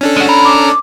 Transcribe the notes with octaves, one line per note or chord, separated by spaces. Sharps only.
C#4 D4 A4
G#3 F#4
A#4 B5
D6